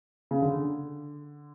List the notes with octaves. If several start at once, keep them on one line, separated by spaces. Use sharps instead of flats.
C#3
D3